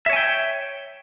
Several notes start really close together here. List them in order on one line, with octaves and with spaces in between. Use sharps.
E5 C#5 G#5 G5